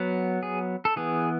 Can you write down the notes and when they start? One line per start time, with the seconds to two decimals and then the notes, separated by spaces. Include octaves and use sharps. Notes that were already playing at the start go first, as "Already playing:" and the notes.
Already playing: F#3 B3
0.43 G#4
0.85 A4
0.96 E3 B3 G#4